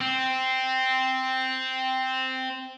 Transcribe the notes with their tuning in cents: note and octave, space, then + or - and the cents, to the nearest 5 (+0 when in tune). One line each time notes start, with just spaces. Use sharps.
C4 -5